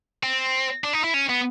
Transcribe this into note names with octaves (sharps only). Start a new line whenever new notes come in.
C4
D4
D#4
E4
C#4
B3